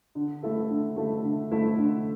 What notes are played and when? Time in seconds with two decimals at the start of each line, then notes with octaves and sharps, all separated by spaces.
0.15 D3
0.43 A3 E4 A4 E5
0.70 D3
0.96 A3 E4 A4 E5
1.24 D3
1.51 A3 E4 A4 E5
1.78 D3